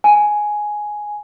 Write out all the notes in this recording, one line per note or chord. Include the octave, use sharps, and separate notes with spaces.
G#5